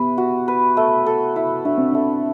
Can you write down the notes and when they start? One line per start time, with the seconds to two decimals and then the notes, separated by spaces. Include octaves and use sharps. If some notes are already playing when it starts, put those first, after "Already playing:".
Already playing: B3 E4 G4 B4
0.18 F#4
0.48 B4
0.77 A3
1.06 A4
1.36 E4
1.65 A3 D4
1.78 C4
1.91 A3 D4